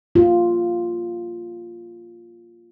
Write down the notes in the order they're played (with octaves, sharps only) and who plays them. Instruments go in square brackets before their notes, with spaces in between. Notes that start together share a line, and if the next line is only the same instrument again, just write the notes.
[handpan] A#3 F4 G4